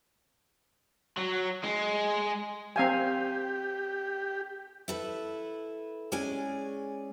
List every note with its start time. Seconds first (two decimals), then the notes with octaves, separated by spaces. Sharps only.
1.17 F#3
1.64 G#3
2.76 C4 G4 F5 G#5
4.88 E4 A4 B4
6.12 G#3 C#4 G#4 D5 G#5